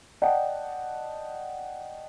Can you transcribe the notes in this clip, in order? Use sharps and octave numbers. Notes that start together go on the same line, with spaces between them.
D5 D#5 F#5 G5 A5